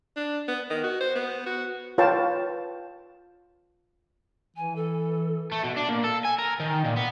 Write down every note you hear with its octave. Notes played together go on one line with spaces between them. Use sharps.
D4
B3
D#3
F#4
C5
B3
F#4
F4 B4 C#5 G5 A5
E3 G#5
A4
A3
B2
D4
A#2
A4
G#5
A#4
D#3
A#2
B3